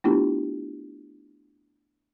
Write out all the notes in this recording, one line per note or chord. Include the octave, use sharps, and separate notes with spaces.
A3 B3 D4 E4 F4 G4